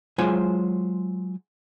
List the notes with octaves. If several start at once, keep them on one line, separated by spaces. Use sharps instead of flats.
F#3 G#3 F4 C5 C#5 G#5